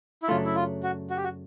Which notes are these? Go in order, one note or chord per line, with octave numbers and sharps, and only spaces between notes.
E4
F#2 C#3 F#3 A3 D4 F4
E4
F4
F#4
F#4
G4
F#4